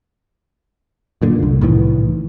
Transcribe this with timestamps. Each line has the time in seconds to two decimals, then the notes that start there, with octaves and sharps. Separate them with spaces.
1.22 F#2 A#2 D3
1.43 C2
1.61 C2 A2 D#3 E3